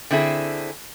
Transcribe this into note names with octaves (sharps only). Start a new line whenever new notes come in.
D3 C4 E4 G#4